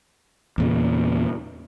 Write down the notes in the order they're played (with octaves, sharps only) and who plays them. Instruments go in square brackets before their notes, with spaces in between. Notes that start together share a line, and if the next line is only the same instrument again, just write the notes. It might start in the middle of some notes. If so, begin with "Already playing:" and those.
[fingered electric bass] E2 A#2 C#3